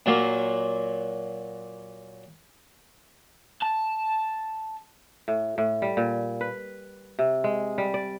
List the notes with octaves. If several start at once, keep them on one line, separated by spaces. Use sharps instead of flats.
A#2 F#3 A#3
A5
A2
A2
G3
A#2
B4
C3
G#3
G3
D5